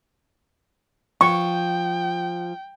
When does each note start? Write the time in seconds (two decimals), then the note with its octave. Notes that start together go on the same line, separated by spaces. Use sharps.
1.21 F3 G5 C#6